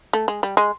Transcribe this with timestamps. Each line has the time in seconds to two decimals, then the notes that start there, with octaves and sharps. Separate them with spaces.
0.13 A3
0.28 G#3
0.43 G3
0.57 G#3